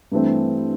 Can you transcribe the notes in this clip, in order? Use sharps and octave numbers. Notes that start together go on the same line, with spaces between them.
G2 E3 A3 C4